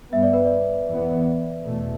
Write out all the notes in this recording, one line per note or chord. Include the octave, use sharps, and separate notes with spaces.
G2 G3 B3 E5
D5
B4
D5
E2 E3 B3
E2 B2 A3